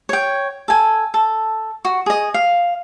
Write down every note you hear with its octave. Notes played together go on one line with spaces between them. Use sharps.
C#5 G5
A4 G#5
A4
F#4
G#4 D#5
F5